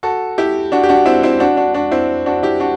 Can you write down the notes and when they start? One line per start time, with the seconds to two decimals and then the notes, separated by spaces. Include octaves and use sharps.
0.03 F#4 A4
0.38 E4 G4
0.72 D4 F#4
0.83 G4
0.89 D4 F#4
1.06 C4 E4
1.23 C4 E4
1.40 D4 F#4
1.57 D4 F#4
1.74 D4 F#4
1.91 C4 E4
2.26 D4 F#4
2.43 E4 G4
2.60 D4 F#4